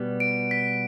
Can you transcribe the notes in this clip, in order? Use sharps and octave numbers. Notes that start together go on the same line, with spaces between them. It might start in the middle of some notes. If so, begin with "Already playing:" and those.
Already playing: B2 G3 B3
D7
B6